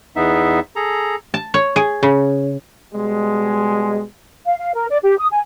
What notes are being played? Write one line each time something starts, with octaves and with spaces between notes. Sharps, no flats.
E2 B3 D#4 E5
G#4 A4 A#5
A5
C#5
G#4
C#3
B2 G3 G#3
F5
F5
A#4
D5
G4
D#6
G#5